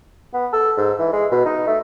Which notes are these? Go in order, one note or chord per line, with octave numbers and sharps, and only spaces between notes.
B3
A4
G#2
E3
G#3
B2
D#4
A3